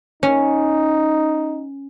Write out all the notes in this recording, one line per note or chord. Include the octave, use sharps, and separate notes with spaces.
C#4 D#4